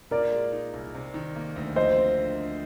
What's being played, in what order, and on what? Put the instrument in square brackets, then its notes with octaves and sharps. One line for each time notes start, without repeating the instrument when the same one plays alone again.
[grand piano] A#2 [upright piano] A#4 D5
[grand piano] G#3
D#4
C2
C3
D#3
A#3
D2
[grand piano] F3 [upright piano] C5 D#5
[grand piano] C4
D3
D3